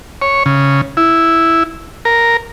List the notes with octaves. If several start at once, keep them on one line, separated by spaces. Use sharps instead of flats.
C#5
C#3
E4
A#4